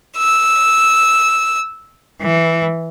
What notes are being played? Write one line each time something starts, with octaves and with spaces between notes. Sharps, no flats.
E6
E3